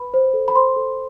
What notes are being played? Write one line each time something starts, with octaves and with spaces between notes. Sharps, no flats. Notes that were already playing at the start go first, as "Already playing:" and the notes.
Already playing: B4 B5
C5
A4
B5
C5 C6
A4